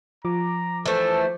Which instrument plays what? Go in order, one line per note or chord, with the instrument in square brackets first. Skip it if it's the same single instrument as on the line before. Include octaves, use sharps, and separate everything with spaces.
[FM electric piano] F3 D6 [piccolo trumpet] A#5
[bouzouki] E3 A3 [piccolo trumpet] A4 [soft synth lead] C5